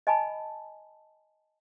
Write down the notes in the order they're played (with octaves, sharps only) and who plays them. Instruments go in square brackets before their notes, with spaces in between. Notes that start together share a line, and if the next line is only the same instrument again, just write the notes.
[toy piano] D#5 G#5 A5 B5